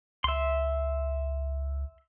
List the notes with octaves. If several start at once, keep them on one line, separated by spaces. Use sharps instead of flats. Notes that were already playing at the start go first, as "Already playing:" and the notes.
C#2 E5 C6